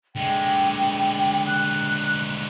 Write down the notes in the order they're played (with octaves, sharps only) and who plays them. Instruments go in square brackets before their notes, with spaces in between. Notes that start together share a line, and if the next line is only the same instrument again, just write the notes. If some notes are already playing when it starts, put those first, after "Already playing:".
[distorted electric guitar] D3 G#3 [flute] G5
[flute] F#6